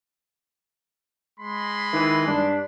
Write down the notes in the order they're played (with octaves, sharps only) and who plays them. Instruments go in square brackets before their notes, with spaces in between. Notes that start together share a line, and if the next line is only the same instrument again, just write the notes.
[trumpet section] G#3 B5 C6
[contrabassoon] D#3 [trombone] E3
[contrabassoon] G2 [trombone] D4